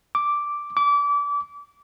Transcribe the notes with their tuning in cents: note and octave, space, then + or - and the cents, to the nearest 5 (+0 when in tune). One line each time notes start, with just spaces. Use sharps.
D6 -5
D6 -30